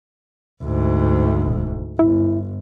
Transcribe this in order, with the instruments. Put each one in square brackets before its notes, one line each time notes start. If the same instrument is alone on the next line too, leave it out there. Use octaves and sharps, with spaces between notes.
[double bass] D2 G#2
[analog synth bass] E1
[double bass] G1 [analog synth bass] E4